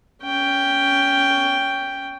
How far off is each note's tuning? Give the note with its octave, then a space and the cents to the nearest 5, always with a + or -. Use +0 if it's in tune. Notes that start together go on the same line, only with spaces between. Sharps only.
C#4 +15 G5 +0